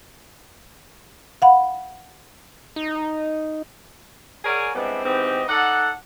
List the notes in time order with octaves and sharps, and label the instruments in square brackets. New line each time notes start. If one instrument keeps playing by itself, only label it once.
[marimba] F5 F#5 B5
[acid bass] D#4
[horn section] G#4 A#4 C#5 D5 F#5 G#5
G3 G#3 B3 C4 D4 E4
G#2 E3 B3 C4 G4 D#5
D#4 A4 D5 F#5